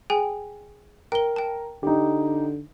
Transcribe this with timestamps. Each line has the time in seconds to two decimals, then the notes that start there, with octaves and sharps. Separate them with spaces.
0.10 G#4 G5 G#5
1.12 A#4 G5 G7
1.36 G5 A5
1.83 D3 D#4 G4